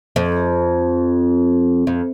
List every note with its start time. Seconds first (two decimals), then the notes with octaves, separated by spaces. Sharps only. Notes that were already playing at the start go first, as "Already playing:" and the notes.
0.16 F2
1.87 F2